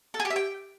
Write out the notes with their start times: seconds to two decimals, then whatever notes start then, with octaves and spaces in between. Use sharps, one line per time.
0.14 A4
0.20 G#4
0.25 G4
0.30 E5
0.36 G5